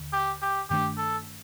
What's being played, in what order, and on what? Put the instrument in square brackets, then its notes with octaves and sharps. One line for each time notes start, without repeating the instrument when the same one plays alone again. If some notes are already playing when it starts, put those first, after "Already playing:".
Already playing: [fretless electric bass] D#2 D3
[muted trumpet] G4
G4
[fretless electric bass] G2 D#3 A3 D4 [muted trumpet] G4
[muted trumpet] A4